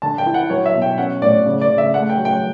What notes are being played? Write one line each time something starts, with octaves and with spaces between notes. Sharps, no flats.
D3 A5
G5
E4
F#5
F#3 C#5
E5
B2
G5
C#4 F#5
A2 D5
C#3
D5
C#3
E5
A3 F#5
G5
F#3
G5